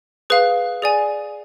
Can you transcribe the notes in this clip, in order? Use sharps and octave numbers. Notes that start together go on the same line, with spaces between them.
G#4 B4 F5
G#4 D5 G#5